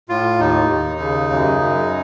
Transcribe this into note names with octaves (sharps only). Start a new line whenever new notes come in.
A2 F4
D#2 D#4
D#2
C#3
F#2
F#2